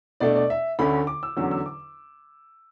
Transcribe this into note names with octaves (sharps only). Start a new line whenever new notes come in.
B2 A3 D4 D5
D5
E5
D2 D3 A3 C#4 B5
D6
E6
E2 D3 F#3 C#4 E6
E6
D6